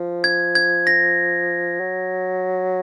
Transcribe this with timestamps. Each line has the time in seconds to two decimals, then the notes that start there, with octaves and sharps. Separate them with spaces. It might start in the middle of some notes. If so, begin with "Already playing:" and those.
Already playing: F3
0.24 G#6
0.55 G#6
0.87 A#6
1.80 F#3